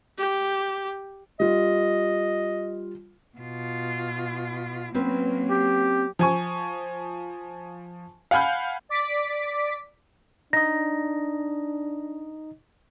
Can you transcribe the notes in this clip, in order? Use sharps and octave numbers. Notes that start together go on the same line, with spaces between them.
G4
G3 F4 D#5
B2 F4
F#3 A#3 C4 C#4 B4
G4
F3 G#5 C#6
F5 F#5 G#5 B5 F6 G6
D5 D6 B6
D4 D#4 D#5 A#6